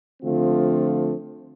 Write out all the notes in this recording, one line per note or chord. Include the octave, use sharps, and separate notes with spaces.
D3 F3 A3 C4 F4